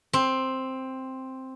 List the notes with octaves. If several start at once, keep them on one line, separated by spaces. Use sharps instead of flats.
C4